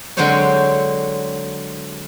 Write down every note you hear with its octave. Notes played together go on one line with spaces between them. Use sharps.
D3 F#3 G#3 C4 C5 C#5